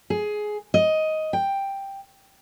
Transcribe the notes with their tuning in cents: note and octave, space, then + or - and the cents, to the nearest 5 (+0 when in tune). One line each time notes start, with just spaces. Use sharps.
G#4 +15
D#5 +10
G5 +5